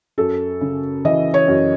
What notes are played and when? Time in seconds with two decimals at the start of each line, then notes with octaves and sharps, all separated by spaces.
0.18 F#2 A4
0.61 C#3
1.05 E3 D#5
1.34 C#5
1.48 F#2